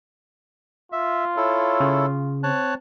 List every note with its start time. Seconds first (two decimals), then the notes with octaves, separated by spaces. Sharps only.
0.92 F4 E5
1.37 E4 A4 C#5
1.80 C#3
2.43 C4 C#5 A5 F#6